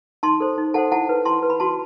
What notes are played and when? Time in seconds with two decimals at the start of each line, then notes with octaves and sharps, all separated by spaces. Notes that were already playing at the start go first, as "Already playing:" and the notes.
0.23 D#4 A5 C6
0.40 A4 C5
0.58 D#4
0.74 A4 C5 F#5 A5
0.92 E4 F#5 A5
1.09 B4
1.25 E4 A5 C6
1.43 B4
1.50 B5
1.60 F#4 A5 C6